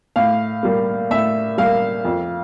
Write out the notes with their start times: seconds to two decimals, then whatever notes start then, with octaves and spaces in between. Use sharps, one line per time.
0.16 A2 F5
0.63 G3 A#3
1.10 A2 E5
1.58 G3 A#3 F5
2.04 F2